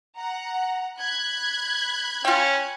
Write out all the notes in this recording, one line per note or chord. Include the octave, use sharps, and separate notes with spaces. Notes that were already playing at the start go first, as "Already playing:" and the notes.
F#5 A#5
B5 F#6 G#6
C#4 F4 G5